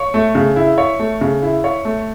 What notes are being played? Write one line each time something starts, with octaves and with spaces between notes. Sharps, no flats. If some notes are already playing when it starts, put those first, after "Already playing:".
Already playing: C#5
A3
C#3
E4
C#5
A3
C#3
E4
C#5
A3